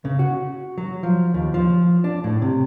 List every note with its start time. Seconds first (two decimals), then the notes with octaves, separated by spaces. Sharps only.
0.05 C#3
0.19 F#4
0.78 F#3
1.03 F3
1.34 D#2
1.54 F3
2.04 D4
2.24 A2
2.42 C3